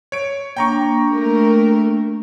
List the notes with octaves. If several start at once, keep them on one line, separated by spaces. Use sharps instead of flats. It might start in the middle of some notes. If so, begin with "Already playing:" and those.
C#5 D7
A#3 D4 G5 A#5 C#6
A3 A#4